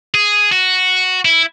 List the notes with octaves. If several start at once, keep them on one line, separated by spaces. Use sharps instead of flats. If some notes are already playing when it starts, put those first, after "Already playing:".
G#4
F#4
E4